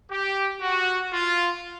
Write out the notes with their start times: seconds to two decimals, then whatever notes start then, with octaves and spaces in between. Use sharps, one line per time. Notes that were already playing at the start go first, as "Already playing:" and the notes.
0.10 G4
0.61 F#4
1.13 F4